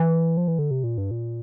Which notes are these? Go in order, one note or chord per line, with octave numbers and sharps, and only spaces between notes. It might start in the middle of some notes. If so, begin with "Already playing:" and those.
Already playing: E3
F3
E3
D3
C3
A#2
G2
A#2